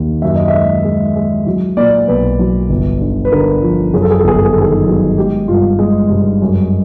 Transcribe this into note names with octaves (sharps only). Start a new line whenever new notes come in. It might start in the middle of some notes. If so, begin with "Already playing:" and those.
Already playing: D#2
F#2 E5
D#5
G#3 E5
G#3
G#3
F#3
A#2 D5
B1 B4
F#3
G1
D3
B4
D3 A#4
F3
F#2 G#4
A4
G#4
A4
G1 G#4
A4
G#4
D#3 A4
G#4
F#3
G#3 G4
G2 F4
G#3
G2
F#2